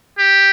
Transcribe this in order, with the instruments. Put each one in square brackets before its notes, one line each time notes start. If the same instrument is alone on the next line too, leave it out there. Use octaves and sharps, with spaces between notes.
[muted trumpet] G4